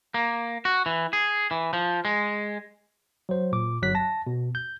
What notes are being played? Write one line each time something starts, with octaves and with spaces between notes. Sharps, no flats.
A#3
F#4
E3
G#4
E3
F3
G#3
F#3 C5
A#2 D6
G1 F#3 F#6 B6
A5 A#6
B2
G6